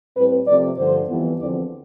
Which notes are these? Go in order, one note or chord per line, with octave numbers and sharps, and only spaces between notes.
A2 G3 C4 B4
C3 F3 A3 C4 D5
G2 D3 F3 C5
F2 E3 G3 B3
E2 D3 F3 C4 D5